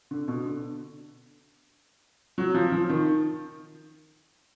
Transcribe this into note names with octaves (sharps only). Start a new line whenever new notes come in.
D3
B2
D3
F#3
F3
F3
D#3